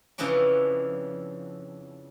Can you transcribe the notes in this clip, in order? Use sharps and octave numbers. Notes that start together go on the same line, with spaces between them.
F2 C#3 E3 F3 C#4 D4